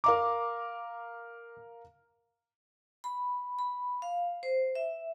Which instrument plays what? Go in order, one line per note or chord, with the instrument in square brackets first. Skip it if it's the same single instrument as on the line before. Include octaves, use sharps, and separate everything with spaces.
[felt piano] A#4 F5 A#5 [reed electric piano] D6
[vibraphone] B5
B5
F5
C5
E5